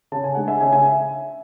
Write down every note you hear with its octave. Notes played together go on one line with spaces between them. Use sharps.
C#3 A5
G#5
G#3 D4 F#5
E5 G#5
C#3 E5 G#5
E5 G#5